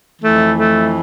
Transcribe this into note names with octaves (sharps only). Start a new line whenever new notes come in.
F2 E3 A3
A3